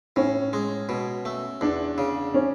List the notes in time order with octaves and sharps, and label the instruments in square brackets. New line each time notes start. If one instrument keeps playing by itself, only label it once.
[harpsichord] A2 [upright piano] C#4
[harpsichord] G#3
B2
A3
[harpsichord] E2 [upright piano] D4
[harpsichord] C#3
[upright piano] C#4